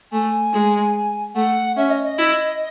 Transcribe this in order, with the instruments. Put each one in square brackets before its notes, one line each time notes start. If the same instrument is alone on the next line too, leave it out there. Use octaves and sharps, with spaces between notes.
[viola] A3 [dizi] G#5
[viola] G#3
[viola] A3 [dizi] F#5
[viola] C#4 [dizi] E5
[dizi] D#5
D#5
[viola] E4